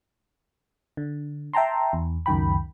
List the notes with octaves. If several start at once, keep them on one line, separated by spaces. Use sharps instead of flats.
D3
E5 G5 A5 A#5 C6
E2
C#2 F#2 D#3 G5 B5